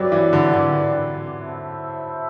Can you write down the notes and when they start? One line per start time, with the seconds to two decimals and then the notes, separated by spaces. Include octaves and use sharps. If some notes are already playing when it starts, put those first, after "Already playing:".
Already playing: F#3 E4 G4 B4 D5
0.12 E3
0.33 D3
0.54 D3
1.38 A3 E4 A4 C5 E5